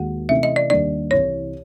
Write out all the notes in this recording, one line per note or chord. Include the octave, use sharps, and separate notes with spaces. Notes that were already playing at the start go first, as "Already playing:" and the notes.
Already playing: D#2 D#3 G#3 F#4 F#5
C3 E3 A3 C#4 E5
D#5
D5
D#2 D#3 G3 A#3 D4 D5
C2 C3 E3 C#5